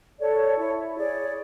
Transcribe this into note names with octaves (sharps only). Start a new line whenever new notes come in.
A4 C#5 D5
E4 C#5
G#4 C#5 D5